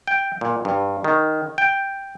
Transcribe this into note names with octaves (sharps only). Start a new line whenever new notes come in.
G5
A#2
G2
D#3
G5